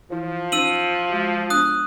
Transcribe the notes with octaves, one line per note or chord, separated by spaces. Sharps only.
E3 F3 E4
C#4 D#4 C5 E6 D#7 F#7
G#3 F#4
B3 D4 D#6 F#6